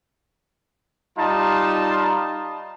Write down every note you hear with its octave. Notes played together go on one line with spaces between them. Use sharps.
G3 D#4 F4 A5